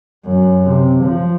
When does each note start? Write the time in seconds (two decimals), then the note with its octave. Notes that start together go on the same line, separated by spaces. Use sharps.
0.26 F#2
0.65 C3
1.04 F3